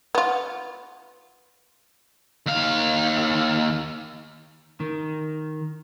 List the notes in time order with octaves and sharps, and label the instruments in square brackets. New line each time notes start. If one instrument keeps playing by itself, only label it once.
[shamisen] B3 F4
[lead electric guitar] D#2 F5
[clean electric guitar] D#3